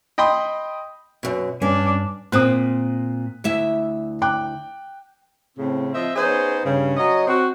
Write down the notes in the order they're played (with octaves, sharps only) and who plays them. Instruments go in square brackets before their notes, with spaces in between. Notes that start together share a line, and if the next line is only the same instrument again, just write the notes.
[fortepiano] D#5 G5 B5 C6 D#6
[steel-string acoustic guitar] F#2 B2
[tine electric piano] G2 [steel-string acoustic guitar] C#4 [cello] D4
[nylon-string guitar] A#2 C4 [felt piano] D#6 F#6
[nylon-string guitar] D2 E4 E5
[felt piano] G5 D6 F#6
[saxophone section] A2 C#3 C4
F3 C4 D#5 E5
B3 C#4 D#4 G#4 C5
G2 C#3
F#3 C#4 D#5
C4 F#4